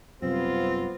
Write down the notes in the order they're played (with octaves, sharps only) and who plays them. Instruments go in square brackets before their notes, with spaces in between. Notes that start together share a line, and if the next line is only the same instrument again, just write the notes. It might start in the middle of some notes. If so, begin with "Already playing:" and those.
[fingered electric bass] F#2 C3 G3 [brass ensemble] B3 F4 [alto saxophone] C4